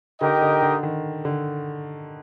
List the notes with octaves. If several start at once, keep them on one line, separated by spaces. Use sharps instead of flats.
D3 D#4 G4 A#4 D#5 G5
D3
D3
D#3
D3